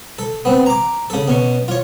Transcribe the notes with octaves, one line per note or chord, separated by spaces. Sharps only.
A4
B3 C4
A#5 D6
C#3 A4
B2 C#4 C#6
F4 C#5